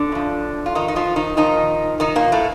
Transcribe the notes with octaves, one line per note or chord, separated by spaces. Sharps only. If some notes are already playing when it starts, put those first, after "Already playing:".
Already playing: D3 D4
A2 F3
F4
D#3 D#4
D#4
F3 F4
D#3 D#4
A#2 D#3 F3 D#4
D#3 D#4
A#2 A#3
A2 A3